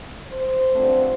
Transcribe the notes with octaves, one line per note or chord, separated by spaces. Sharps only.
C5
G2 D3 F3 A3 C4